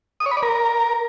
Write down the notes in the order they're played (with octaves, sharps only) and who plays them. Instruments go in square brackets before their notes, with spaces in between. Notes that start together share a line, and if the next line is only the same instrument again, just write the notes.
[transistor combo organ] D#6
C#5
B5
D5
A#4